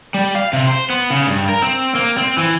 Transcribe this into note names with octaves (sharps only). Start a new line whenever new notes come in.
G3
F5
C3
C5
B3
C#3
G2
A#4
C4
A#3
C4
E3